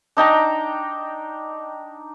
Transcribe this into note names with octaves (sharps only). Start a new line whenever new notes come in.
D4 D#4 G5 A#5